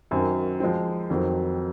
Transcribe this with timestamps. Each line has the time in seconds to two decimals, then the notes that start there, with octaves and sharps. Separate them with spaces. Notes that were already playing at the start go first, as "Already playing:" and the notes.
0.11 F#2 D#3 F#3 C4
0.60 F3 G#3 C4
1.10 F2 D#3 F#3 C4